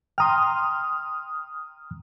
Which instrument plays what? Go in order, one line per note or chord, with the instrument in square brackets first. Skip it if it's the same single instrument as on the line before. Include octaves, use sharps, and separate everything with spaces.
[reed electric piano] G5 A#5 C6 [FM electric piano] D#6 F6